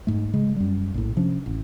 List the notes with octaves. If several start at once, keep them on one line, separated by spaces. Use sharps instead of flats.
G#2 A3
C#3 G#3
F#2 G3
A#1 A2
C3 F3 C#4 D4
A1